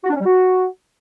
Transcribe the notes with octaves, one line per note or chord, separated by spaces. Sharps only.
F#4
D4
C#4
G3
F#4